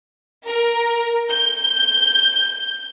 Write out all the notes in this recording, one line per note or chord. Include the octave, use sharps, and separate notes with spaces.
A#4
G6